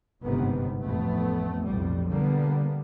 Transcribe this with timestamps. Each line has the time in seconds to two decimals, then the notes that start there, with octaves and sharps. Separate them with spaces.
0.23 G1 G#2 C3 D#3 B3
0.82 A1 F2 A3 B3
1.65 B1 F2 A2 G3
2.08 D3 G3 A#3 B3